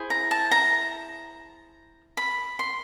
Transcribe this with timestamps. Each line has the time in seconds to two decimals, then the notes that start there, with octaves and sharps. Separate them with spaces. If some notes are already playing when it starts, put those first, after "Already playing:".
Already playing: E4 G#4 C5
0.10 A#5
0.31 A5
0.51 A#5
2.17 B5
2.59 C6